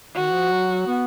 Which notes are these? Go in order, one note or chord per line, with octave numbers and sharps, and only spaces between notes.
D#3 F#4
F3
F#3
B3